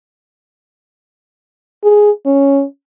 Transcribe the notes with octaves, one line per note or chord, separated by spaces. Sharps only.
G#4
C#4